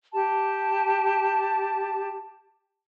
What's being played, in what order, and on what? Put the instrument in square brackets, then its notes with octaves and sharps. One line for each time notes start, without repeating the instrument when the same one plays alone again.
[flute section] G4 A5